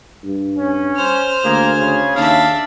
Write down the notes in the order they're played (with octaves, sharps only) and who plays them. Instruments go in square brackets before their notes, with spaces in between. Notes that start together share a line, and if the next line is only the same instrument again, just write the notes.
[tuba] G2
[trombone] C#4
[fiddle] C5 F6
[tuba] D2 [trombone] A#3 [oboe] G#4
[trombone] C#3
[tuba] D#2 [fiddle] D4 E5 [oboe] F5